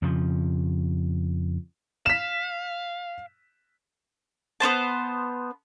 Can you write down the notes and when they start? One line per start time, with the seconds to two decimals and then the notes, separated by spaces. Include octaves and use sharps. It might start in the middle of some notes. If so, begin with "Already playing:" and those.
0.02 F2 C#3 F3
2.06 F5 B6 E7
4.60 B3 C4 C5 A5